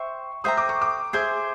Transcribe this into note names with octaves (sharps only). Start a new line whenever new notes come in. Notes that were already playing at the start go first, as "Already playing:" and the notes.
Already playing: C5 E5 G5 C#6
C5 E5 G5 A#5 D#6
D6
C#6
D6
G#4 C5 E5 G6